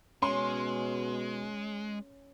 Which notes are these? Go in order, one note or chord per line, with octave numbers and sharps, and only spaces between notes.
B2 G#3 C#4 C6